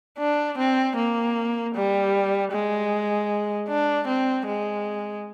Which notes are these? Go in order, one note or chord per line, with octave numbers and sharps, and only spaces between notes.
D4
C4
A#3
G3
G#3
D4
C4
G#3